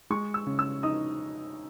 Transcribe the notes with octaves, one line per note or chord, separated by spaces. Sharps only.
G#3 C#6
E6
C#3
E6
D#4 D#6